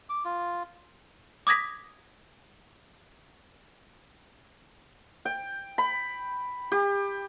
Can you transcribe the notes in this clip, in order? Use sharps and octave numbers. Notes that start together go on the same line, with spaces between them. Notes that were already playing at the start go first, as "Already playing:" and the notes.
D6
F4
D6 D#6 G#6 A#6 B6
G5
B5
G4